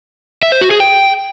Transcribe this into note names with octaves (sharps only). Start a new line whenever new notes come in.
E5
C5
F#4
G#4
G5